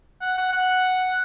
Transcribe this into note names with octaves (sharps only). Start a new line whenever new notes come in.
F#5
F#5
F#5